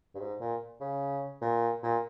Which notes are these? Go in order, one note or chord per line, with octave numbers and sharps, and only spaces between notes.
G2
G#2
A#2
C#3
A#2
A#2